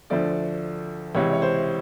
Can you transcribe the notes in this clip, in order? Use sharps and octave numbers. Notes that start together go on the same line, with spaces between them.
D2 D3 F3 A3 D5
C#2 C3 E3 C#5
C#5
C5